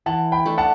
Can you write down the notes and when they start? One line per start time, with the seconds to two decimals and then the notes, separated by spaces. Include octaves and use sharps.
0.06 E3 F#5 A5
0.32 G5 B5
0.46 A3 D4
0.58 F#5 A5